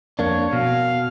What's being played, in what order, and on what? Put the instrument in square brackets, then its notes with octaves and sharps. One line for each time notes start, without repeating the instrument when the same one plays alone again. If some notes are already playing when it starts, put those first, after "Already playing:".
[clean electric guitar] F2 A#3 D4 [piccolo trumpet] C#5
[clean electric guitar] B2 [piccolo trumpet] F5